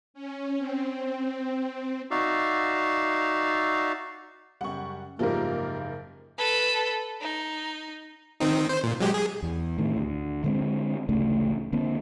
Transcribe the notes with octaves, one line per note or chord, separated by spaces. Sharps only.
C#4
C4
D#4 F#4 D5 E5 F5
F#2 C#3 G3 F#5 C#6
F#1 G#2 F3 G3 A#3 A#4
A4 B4
D#4
D#3 C4 D#4
C5
A#2
F#3 G#3 G4
G#4
E2
A2 D#3 A3
D2
D3 G#3 C4
A1 D2 C#3 A3
D3 A#3 C4